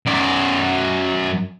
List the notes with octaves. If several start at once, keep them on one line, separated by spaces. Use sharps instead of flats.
F#2 D5